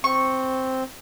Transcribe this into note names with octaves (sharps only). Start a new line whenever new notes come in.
C4 C#6